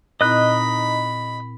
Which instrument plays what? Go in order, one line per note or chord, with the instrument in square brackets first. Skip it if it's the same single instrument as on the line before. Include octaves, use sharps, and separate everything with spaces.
[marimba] A#2 C4 E4 [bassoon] D#4 [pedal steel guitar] D#5 F#6 [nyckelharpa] B5